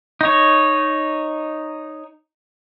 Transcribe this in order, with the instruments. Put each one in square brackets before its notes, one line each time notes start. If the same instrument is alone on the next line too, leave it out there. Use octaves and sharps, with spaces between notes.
[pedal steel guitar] D#4 C#5